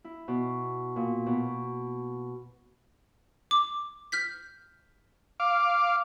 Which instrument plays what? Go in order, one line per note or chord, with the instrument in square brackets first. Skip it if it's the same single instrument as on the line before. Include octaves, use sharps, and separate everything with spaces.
[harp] E4
B2
A#2
B2
[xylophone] D6
F6 G6 B6
[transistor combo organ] F5 D6